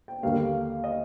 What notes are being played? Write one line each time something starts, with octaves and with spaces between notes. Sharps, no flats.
G5
D#2 D3 G3 A#3 F5
D#5